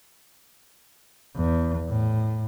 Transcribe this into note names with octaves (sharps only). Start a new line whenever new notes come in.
E2
A2